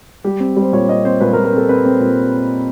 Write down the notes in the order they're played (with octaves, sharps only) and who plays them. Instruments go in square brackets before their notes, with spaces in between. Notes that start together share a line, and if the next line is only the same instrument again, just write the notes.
[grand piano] G3 G4
C4
G3
C5
A#2 C#5
C4 D#5
C4 C5
A#2 B4
A#4
A#2
A#4
C4 A4
C4 B4
C4
A#2